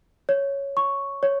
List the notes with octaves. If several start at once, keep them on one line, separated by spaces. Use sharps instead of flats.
C#5
C#6
C#5